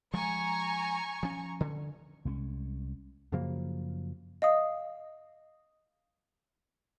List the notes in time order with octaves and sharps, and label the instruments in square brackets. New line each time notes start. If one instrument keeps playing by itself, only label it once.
[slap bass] F3 G#3 [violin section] G#5 A#5 C#6
[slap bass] F3 C#4
D3
C2 G#3 C4 C#4
[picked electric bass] F#2 C#3 F3 A#3
[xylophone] D#5 F5 D#6